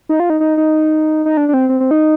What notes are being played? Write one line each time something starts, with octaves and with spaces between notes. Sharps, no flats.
D#4
F4
D#4
D#4
D#4
D#4
D4
D4
C4
C4
C4
D#4